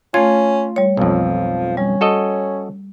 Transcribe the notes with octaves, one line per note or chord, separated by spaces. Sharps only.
A3 C#4 F4 G#6
G3 C#5
B1 F2 F3
G3 C#4
F#4 A4 D#5